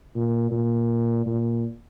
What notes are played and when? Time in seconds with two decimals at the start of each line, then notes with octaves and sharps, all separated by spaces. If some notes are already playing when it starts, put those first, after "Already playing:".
0.15 A#2
0.51 A#2
1.26 A#2